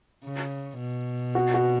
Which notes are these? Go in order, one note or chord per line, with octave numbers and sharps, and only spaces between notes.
C#3
B2
F#4
F#4